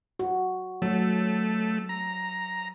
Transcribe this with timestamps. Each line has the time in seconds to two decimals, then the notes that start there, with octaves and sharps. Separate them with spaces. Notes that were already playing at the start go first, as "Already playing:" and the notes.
0.19 F#4
0.82 F#3 A3
1.89 A#5